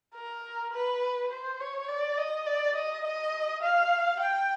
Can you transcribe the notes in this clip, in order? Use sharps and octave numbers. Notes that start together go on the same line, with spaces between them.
A#4
B4
C5
C#5
D5
D#5
D5
D#5
D#5
F5
G5